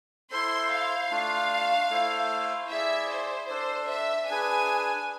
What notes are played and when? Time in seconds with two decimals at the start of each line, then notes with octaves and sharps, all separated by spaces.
0.31 E4 A4 C5 C6
0.71 F5
1.11 A3 D4 F4
1.90 A3 E4 A4 C5
2.69 E4 G#4 D5 E5
3.09 C5
3.49 D4 A4 C5 D5
3.89 E5
4.29 D4 G#4 B4 G#5